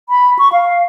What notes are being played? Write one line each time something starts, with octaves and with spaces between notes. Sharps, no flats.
B5
C#6
F5